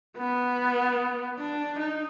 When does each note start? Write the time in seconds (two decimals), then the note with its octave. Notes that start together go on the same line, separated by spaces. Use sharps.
0.18 B3
1.39 D4
1.79 D#4